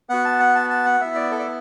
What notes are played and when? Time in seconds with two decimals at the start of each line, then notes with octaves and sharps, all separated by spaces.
0.09 B3 F#4 F#5
0.25 A5
0.40 F#5
0.55 A5
0.70 A5
0.85 F#5
1.01 B3 E4 E5
1.15 D5
1.31 A4
1.39 D5